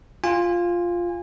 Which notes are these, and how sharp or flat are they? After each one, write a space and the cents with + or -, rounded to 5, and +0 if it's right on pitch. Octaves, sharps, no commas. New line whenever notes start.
F4 +0 G#5 -30